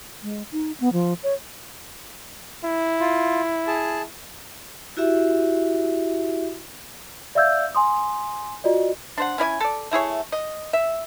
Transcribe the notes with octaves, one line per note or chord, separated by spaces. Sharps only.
G#3
D#4
B3
F3
C#5
E4
F4
G#4 A5
E4 F#4 G4 E5
D5 E5 F5 E6 G6 G#6
G#5 C6 D#6
F4 F#4 D5 D#5
D4 C5 F#5
C#4 E4 D5 G#5
A4 D5
A3 E4 G#4 C#5
D#5
E5